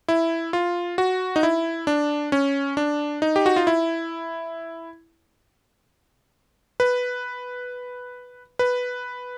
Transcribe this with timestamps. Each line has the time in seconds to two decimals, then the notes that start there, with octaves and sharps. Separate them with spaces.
0.08 E4
0.53 F4
0.98 F#4
1.36 D#4
1.43 E4
1.87 D4
2.32 C#4
2.77 D4
3.22 D#4
3.36 G4
3.46 F#4
3.56 F4
3.67 E4
6.80 B4
8.59 B4